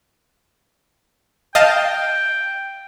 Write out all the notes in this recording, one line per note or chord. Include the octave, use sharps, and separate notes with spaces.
D#5 F5 G5 A5